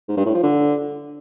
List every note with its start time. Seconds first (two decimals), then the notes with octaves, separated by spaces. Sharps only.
0.08 G#2
0.17 G2
0.26 A2
0.34 F3
0.43 D3